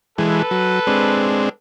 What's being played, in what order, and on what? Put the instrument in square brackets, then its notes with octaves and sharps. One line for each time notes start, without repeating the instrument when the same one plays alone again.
[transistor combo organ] E3 G#3 [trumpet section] A4 B4
[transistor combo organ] F#3
G#3 C4 D4